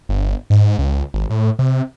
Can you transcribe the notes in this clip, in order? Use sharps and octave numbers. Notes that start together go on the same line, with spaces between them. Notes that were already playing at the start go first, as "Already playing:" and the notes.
G1
G#2
C#2
G#1
A2
C3